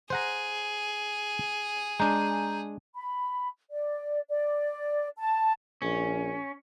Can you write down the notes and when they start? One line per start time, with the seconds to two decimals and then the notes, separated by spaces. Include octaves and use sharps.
0.10 G#4 C5 F#5 A#5
2.00 G#3 D4 G#5 A#5 G6
2.95 B5
3.71 D5
4.29 D5
5.17 A5
5.82 A#1 C#4